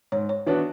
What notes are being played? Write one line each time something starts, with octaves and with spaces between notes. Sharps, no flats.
G#2 C#5
C#5
E3 B3 D4 F#4 C#5